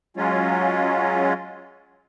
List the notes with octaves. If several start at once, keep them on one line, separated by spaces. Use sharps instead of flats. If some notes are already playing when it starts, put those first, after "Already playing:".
F#3 G#3 C#4 F4